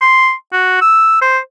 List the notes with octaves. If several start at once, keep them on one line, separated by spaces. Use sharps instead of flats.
C6
F#4
E6
C5